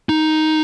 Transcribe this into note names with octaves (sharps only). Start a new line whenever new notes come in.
D#4